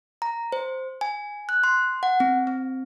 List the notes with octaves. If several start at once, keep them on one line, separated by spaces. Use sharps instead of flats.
A#5
C5
G#5
F#6
C6
F#5
C4
C4